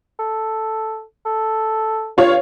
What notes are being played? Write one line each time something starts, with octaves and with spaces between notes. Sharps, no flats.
A4
A4
G2 F4 C#5 F5